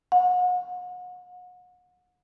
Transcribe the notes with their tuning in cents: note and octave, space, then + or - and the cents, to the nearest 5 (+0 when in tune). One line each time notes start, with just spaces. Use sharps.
F#5 -40